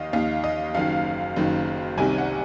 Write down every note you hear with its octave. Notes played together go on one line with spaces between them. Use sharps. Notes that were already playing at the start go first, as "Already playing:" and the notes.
Already playing: D#2 D#3 D#5 F5
D#2 D#3 F5
D#5
F#1 F#2 D#3 F5
F#1 F#2 D#3
C2 C3 D#3 G#5
F#5